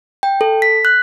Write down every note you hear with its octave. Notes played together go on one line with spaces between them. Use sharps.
G5
A4
B6
F#6